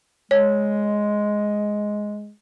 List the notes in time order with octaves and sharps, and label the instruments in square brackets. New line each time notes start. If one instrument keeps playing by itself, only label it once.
[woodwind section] G#3 [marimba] C#5